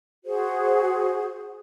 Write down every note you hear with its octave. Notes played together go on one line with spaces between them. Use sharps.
F#4 G#4 C5